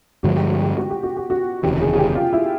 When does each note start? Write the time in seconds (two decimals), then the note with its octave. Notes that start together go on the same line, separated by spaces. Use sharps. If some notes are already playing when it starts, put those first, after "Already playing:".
0.23 G2 D3 F3 G#3 F#4
0.36 G4
0.50 F#4
0.64 G4
0.77 F#4
0.90 G4
1.03 F#4
1.17 G4
1.30 F#4
1.63 F1 D#2 C#3 E3 G4
1.81 G#4
1.94 G#4
1.99 G4
2.15 F4
2.33 E4